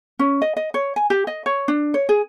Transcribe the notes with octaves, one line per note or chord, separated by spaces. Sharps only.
C#4
D#5
D#5
C#5
G#5
G4
D#5
C#5
D4
C#5
G#4